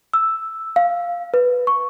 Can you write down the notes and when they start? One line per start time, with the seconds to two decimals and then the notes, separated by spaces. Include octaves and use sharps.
0.14 E6
0.76 F5
1.34 B4
1.67 C#6